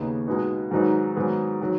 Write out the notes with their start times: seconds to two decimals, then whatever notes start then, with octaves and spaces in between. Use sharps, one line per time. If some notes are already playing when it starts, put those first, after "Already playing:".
Already playing: D#2 C#3 B3 D#4
0.27 B2 G#3 B3 D#4
0.71 G#2 D#3 F#3 D#4 B4
1.16 G#2 D#3 F#3 B3 G#4
1.61 D#3 F#3